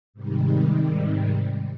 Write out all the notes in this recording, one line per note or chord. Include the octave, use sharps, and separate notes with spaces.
G#2 C3 D#3 G3